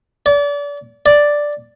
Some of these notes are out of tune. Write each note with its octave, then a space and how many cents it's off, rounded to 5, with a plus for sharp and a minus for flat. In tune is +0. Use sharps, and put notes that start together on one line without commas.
D5 -35
D5 +0